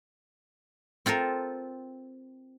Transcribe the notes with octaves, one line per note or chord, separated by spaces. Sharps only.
C4 F4 A4 A#4